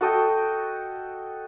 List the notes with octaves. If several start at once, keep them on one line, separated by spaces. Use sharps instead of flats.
F#4 A4 D#5 G5